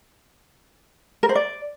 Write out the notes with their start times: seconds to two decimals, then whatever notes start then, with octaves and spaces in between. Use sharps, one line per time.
1.23 A#4
1.29 C5
1.35 D5